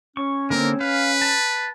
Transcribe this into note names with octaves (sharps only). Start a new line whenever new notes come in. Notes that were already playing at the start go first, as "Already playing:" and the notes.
C#4 C#6
D3 A#3 C4 A#4
B4 F5
A5